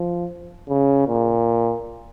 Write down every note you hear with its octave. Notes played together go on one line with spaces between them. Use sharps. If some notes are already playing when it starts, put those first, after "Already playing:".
Already playing: F3
C#3
A#2